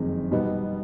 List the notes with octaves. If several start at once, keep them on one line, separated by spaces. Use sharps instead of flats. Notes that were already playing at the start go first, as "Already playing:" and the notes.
Already playing: F#1 F2 C3 D#3 G#3
B2 G3 B3 D#4